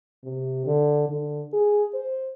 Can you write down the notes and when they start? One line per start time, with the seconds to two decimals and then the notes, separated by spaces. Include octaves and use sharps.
0.24 C3
0.66 D3
1.09 D3
1.53 G#4
1.94 C5